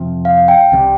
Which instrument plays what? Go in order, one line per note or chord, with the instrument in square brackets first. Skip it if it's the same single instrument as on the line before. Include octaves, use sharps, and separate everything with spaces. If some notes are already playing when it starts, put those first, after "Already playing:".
Already playing: [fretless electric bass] F2 C3 F3 C4
[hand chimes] F5
G5
[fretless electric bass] C2 C3 G3